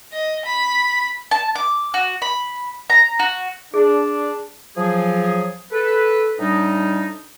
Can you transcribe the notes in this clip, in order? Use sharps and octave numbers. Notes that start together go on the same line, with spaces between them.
D#5
B5
A5
D6
F#4
B5
A#5
F#4
D4 G#4
F3 F#3 G#4
A4 B4
A2 G3 D4 D#4